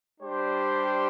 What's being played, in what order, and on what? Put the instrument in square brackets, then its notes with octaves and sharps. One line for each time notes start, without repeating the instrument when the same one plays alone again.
[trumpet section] G3 D4 G4 C5